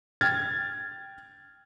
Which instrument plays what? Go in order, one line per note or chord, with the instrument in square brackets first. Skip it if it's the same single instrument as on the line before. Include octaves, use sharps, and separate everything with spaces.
[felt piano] G5 F6 G#6 A6